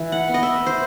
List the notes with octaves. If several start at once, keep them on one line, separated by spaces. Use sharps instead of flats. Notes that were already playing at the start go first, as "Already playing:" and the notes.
Already playing: E3
F#5
B3
D#5
E5
C5